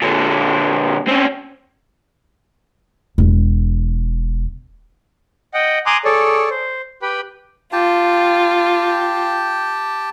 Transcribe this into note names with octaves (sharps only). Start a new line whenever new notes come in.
A#2 D3
C4 C#4
E1
D#5 F#5 G5
G#5 A#5 C6 D6 D#6 F#6
G#4 A4 C#5 D5
C5
G4 B4 G5 B5
F4 G4 G5 A5